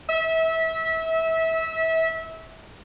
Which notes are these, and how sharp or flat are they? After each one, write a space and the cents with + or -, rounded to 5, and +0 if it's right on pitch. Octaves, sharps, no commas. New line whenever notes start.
E5 -25